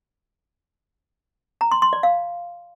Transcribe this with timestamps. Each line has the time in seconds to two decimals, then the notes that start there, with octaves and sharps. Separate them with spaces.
1.61 A#5
1.71 C6
1.82 C6
1.93 D5
2.03 F5